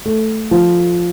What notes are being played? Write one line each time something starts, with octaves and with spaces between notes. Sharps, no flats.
A3
F3